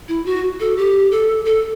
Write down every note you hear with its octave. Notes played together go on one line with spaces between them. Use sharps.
E4
F#4
A4
G4
A4
A4